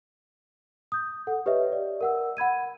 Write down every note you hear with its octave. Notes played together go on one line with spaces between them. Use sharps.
D#6 G6
A4 F#5
G4 B4 C#5 D#5 E5
D5
A#4 F#5 E6
F#5 B5 G#6 D#7